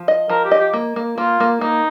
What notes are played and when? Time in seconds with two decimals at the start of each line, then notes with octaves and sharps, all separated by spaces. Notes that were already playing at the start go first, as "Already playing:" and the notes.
Already playing: F3
0.08 D#5
0.29 F3 A#4
0.45 G4
0.51 D#5
0.59 G4
0.73 A#3
0.96 A#3
1.18 A#3 F4
1.40 A#3
1.61 A#3 D#4